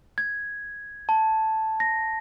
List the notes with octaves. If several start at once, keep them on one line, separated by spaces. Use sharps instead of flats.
G#6
A5
A#6